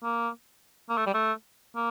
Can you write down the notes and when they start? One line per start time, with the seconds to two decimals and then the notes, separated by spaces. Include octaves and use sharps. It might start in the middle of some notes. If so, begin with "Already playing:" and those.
0.03 A#3
0.89 A#3
0.97 A3
1.06 G3
1.14 A3
1.76 A#3